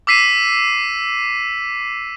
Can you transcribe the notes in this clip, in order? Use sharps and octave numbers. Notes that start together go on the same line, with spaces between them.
D6 E6 B6 C7 D#7